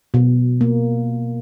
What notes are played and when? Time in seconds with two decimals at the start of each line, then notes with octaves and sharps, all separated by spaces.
0.14 B2
0.61 A#3